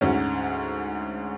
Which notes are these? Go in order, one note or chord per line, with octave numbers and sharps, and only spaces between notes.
D2 G#2 C#4